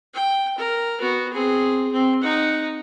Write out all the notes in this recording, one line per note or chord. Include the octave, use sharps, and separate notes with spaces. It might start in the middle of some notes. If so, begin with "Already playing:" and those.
G5
A#4
B3 F#4
C4 G#4
C4
D#4 F#5